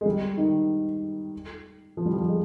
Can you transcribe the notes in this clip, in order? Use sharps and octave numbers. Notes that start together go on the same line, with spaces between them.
G#3
G3
D#3
F3
G3
F3
G#3